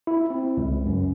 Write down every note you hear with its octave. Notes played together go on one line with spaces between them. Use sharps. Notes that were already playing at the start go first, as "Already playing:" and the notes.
E4
C4
C#2
F#2